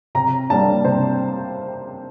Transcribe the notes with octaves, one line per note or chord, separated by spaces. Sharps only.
C3 A#5
G3 A#3 D4 A5
C3 C5